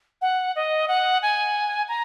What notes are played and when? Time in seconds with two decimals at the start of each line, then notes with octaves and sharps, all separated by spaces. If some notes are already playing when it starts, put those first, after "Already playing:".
0.22 F#5
0.56 D#5
0.88 F#5
1.22 G#5
1.88 A#5